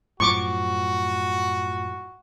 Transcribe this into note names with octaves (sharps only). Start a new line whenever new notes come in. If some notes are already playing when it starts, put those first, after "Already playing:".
F#2 A2 F3 F#4 C#6 D6